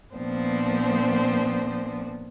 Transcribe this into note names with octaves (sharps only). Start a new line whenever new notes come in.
A#2 F3 B3 C4 D4